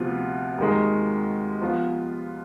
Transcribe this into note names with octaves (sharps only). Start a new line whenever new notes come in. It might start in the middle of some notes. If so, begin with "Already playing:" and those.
Already playing: D2 C3 F3 B3 F4
D#2 D#3 G#3
F3 B3 F4